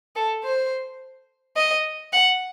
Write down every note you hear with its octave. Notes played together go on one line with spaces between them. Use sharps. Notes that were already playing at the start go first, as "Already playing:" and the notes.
A4
C5
D#5
F#5